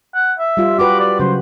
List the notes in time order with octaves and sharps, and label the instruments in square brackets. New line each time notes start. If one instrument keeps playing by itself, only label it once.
[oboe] F#5
E5
[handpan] G3 F4
[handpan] F#4 G4 B4 [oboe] D6
[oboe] D5
[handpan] C#3 F#3 [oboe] C5